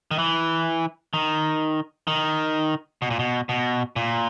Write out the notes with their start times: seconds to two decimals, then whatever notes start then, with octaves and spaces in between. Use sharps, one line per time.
0.11 D#3
0.19 E3
1.14 D#3
2.08 D#3
3.02 B2
3.11 A#2
3.19 B2
3.49 B2
3.96 A#2